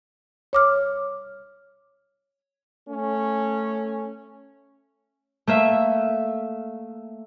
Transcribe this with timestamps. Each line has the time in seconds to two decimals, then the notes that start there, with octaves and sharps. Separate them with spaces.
0.53 C#5 D6 F6
2.88 A3 C#4
5.47 A3 A#3 E5